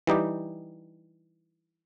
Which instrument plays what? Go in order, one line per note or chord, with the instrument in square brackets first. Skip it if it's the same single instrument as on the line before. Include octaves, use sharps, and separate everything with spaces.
[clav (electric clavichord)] E3 G3 D#4 G4